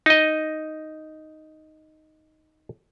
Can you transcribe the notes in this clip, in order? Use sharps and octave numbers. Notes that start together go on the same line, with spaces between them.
D#4 D#5